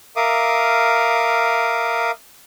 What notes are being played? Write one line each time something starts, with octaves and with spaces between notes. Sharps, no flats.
A#4 E5 F5 D6 D#6